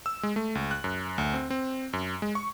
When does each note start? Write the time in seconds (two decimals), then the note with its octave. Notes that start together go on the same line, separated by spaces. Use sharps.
0.06 E6
0.23 G#3
0.36 A3
0.55 C#2
0.71 F#6
0.84 F#2
1.18 D2
1.34 C4
1.50 C4
1.93 F#2
2.22 G#3
2.35 C#6